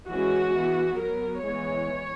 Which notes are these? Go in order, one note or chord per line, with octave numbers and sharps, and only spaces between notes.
E3 G#3 C#4 F#4
E3 B3
F#3 B3 A#4
E3 G#3 B3 C#5